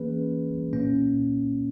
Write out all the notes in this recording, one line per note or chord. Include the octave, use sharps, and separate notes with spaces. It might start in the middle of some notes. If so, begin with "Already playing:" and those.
Already playing: E3 A#3 C#4 G#4 B4
A#2 A#3 C#4